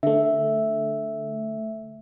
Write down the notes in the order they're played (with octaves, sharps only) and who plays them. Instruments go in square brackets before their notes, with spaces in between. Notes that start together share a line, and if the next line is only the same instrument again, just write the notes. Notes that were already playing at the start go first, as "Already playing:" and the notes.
[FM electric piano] D3 A3 [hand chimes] E5